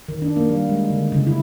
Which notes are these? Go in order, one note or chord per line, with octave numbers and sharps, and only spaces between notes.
D#3
D4
A#3
G3
G#3
D3
C#3
E4